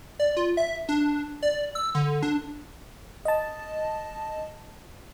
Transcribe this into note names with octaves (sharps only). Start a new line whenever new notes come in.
D5
F4
E5
D4
D5
E6
D3
D4
D#5 A5